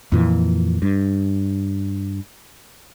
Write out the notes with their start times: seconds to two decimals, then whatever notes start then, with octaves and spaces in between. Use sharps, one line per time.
0.12 F2 A#2 E3
0.82 G2